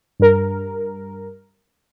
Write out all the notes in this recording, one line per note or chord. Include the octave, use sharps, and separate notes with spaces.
G2 A#4